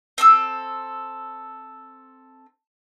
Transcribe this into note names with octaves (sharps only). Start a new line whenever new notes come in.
C4 A4 E6